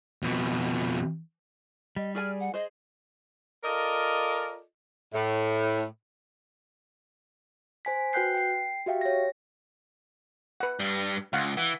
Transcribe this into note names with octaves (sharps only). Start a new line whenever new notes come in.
F2 B2
G3 D#5
G#4 D5 G#5 F6
F#5
G#4 C5 D#5
F4 A4 A#4 D5 D#5
A2
C5 G#5 B6
F#4 B4 G5 F#6 G6 C7
G5 C7
F#4 G4 E5 F5 G5
C#5 A#6
B4 F#5
G2 G3
C#2 F5 F#5
E3 F#5